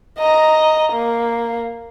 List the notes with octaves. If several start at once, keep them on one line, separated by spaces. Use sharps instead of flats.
D#5 A#5
A#3